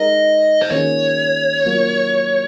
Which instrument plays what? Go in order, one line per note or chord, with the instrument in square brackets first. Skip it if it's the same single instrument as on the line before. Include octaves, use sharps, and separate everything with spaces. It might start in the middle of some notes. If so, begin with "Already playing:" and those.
Already playing: [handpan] G#3 D#4 A#4 [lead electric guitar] D#5
[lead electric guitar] C5
[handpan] D#3 A#3 C#4 F4 G#4 [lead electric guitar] C#5
[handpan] F#3 A#3 F4